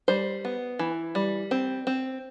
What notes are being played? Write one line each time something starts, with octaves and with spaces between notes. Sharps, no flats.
G3 C5
B3
E3
G3
C4
C4